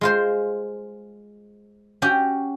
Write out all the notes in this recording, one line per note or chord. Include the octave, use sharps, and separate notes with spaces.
G#3 F4 C5
C#4 F#4 G4 G5